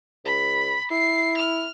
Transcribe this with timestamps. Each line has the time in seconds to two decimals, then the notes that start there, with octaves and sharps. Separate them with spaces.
0.25 C#2 B5
0.91 E4 C7
1.37 F6